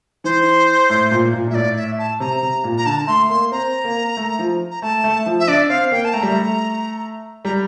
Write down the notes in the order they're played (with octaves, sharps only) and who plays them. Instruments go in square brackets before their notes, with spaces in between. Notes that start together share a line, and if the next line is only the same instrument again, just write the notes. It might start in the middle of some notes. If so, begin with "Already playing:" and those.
[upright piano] E3 [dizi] C5
[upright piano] A2
A#2
A#2
A#2
[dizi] E5
[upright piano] A2 [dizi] D5
[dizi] E5
A5
[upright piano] C3 [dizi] A#5
[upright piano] C3
A#2
[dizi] A#5
[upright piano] D3 [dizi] A5
[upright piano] A3 [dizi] C6
[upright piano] A#3 [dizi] C6
[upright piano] C4 [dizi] A#5
[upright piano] A#3
A3
F3
[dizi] A#5
[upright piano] A3 [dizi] A5
[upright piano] A3
F3
[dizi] E5
[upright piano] D4 [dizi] D5
[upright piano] C4 [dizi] F5
[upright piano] A#3 [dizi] G5
[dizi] A5
[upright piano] A3 [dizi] A#5
[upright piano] G3
A3
[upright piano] G3 [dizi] A#5